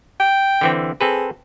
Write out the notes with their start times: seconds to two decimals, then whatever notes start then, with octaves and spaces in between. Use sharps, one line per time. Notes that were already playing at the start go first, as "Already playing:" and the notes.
0.20 G5
0.61 D3 E3 C4
1.01 C4 G#4 A4 B4